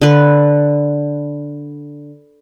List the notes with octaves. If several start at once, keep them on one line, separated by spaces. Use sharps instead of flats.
D3 B4